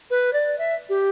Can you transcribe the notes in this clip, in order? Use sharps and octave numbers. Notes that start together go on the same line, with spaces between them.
B4
D5
E5
G4